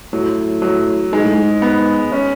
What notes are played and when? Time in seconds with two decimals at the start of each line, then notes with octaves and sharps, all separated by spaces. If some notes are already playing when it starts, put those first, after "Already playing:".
0.13 A2 F#3
0.62 F#3
1.13 G#2 G#3
1.24 A2
1.35 G#2
1.62 B3
2.12 C#4